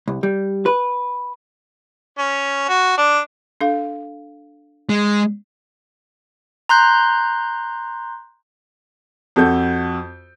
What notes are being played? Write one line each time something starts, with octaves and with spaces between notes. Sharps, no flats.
C2
G3
B4
C#4
F#4
D4
D4 A4 F5
G#3
A#5 C6 F#6 G6
F2 F#4 A4 G6